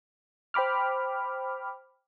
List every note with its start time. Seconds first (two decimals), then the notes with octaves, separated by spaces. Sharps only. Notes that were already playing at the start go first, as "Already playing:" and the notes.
0.54 C5 G5 B5 D6 F6